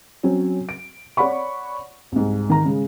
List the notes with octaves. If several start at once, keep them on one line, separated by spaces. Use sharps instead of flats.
F#3 C4 C#4
D7
C#5 D5 F#5 B5 C#6
C2 G#2
D#3 A#5
C#3 G#3